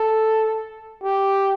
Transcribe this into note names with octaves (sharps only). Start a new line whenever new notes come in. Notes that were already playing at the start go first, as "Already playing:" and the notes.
Already playing: A4
G4